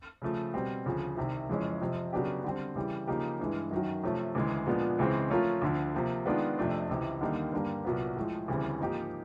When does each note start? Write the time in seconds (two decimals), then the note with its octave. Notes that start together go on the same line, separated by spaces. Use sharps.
0.22 C#3 F3 A3
0.54 B2 G3 C4
0.86 D2 C#3 F3
1.17 C2 C3 D#3
1.49 F2 C#3 E3 G#3 C#4
1.81 F2 C3 F3
2.13 C#3 F#3 B3 D4 G4
2.44 D3 G3 C4
2.76 C#3 E3 G3
3.07 C#3 F3 A#3 D#4 G4
3.40 G2 E3 G#3
3.71 F#2 D#3 F#3
4.03 C3 F3 A3 C#4
4.35 D2 C#3 E3 G#3
4.67 A#2 F3 G#3 B3 D4
4.98 C#2 C#3 E3 G#3 C4
5.30 F3 A3 C#4 F4 A#4
5.62 D2 D3 F3
5.95 C3 F3 A#3
6.26 D#3 G#3 B3 D4 F4
6.58 F2 C3 F3 A3 D4
6.89 C#2 C3 E3
7.21 D#2 D3 G3 A#3 D#4
7.52 G2 D3 G3 A#3
7.85 C2 A#2 F#3 B3
8.17 A2 F3 G#3
8.48 D2 C#3 E3 G3 C4
8.80 G#2 F3 A#3 D#4 G4